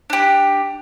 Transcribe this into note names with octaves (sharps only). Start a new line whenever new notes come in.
D4 G4